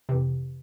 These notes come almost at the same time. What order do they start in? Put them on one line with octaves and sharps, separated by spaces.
C3 E3 F2